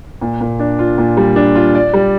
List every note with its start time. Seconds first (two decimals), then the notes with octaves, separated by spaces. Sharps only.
0.21 A#2
0.41 A#2
0.59 D4
0.79 F4
0.98 A#2
1.17 G3
1.36 D4
1.55 F4
1.75 D5
1.94 G3